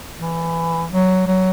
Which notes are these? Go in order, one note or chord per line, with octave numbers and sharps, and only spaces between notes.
E3
F#3
F#3